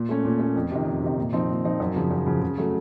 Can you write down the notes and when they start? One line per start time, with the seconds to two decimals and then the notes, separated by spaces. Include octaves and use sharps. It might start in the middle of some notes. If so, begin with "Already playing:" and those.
Already playing: A#2
0.09 A3 C#4
0.25 A#2
0.40 A3 C#4
0.56 F2
0.71 C3 D#3
0.86 F2
1.03 C3 D#3
1.18 A#2
1.33 F3 C4 D#4
1.49 A#2
1.65 F3 C4 D#4
1.80 F#2
1.96 C#3 F3
2.11 F#2
2.27 C#3 F3
2.42 C#3
2.58 F#3 A3